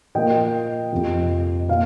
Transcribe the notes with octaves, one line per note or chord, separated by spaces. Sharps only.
A#2 F3 A#3 D#5 G5
F2 C3 F3
A#2 F5